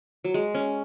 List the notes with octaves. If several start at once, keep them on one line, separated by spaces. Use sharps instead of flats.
F#3
G#3
C#4